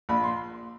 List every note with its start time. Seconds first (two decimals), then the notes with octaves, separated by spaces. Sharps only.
0.09 A#1 B5
0.24 C6